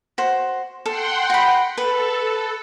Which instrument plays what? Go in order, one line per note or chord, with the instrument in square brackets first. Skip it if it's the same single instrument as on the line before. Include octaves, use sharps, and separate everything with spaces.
[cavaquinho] F#4 C5
[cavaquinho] A4 [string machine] F#5 G5 C6
[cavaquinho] F#4 B5
[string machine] A4 [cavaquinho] B4